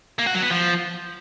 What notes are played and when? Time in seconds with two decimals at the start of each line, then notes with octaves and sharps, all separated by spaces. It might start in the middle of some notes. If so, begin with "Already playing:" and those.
0.19 A#3
0.27 F#4
0.35 F#3
0.43 B3
0.51 F3